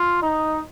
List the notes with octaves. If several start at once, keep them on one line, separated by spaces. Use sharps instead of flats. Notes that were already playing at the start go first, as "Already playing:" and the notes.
Already playing: F4
D#4